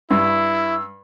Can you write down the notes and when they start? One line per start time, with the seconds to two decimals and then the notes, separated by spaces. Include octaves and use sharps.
0.11 G2 E4 E6